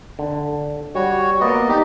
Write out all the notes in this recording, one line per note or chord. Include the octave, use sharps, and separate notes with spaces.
D3
G3 F#4 C#5
A#3 B3 D5 D#5
D#4 G4